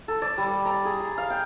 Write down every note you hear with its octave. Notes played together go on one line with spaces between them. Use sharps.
A4
D5
G3
A#5
G#4
G#4
F5
G5